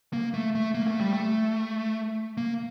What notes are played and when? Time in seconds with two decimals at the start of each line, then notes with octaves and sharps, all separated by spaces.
0.13 A#3
0.34 A3
0.55 A3
0.74 A#3
0.87 A3
1.00 G3
1.13 A3
2.37 A#3